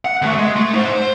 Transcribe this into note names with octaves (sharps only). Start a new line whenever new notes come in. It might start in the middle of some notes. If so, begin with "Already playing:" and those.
F#5
D#2 A3
G#3
A3
D#4 C5
C5